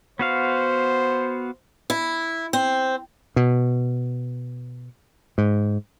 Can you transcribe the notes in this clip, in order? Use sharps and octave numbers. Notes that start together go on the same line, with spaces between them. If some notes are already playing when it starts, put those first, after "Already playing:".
B3 F#4 C5 F5
E4
C4
B2
G#2